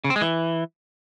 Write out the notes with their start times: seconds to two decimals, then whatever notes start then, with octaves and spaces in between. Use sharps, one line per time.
0.04 C#3
0.10 C4
0.16 G#3
0.22 E3